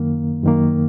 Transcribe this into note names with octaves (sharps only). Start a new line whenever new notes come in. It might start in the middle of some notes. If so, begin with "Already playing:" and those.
Already playing: F#2 D#3 A#3
F#2 D#3 A#3